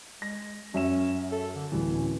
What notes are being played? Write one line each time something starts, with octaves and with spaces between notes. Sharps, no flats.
G#3 A#6
F#2 C#4 E5 E7
A4
D3
D1 E3 G3
C#4